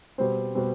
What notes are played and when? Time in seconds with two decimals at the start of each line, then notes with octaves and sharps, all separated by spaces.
0.18 B2 G3 C4 C5
0.55 B2 G3 C4